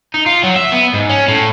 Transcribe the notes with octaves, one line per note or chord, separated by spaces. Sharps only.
D#4
F4
F#3
E5
B3
G#2
C#4
A2